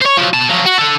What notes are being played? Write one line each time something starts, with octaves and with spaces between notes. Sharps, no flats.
C5 C#5
F3 F#3
B2 A5
F3 F#3
F#4
A4 F#5